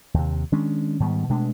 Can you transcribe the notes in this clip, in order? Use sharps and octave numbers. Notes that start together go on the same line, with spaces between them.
D#2 C3
D#3 G#3 C#4 D4
G#2 D#3 G3 B3
B2 G#3 A3 D4